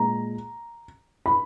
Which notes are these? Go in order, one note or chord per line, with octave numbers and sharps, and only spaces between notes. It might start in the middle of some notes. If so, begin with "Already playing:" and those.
Already playing: A#2 G#3 A#5
B5